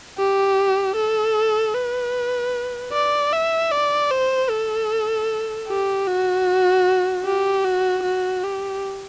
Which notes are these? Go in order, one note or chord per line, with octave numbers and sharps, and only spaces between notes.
G4
A4
B4
D5
E5
D5
C5
A4
G4
F#4
G4
F#4
F#4
G4